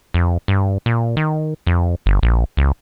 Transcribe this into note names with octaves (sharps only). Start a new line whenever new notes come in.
F2
G2
A#2
D#3
F2
G1
A#1
C#2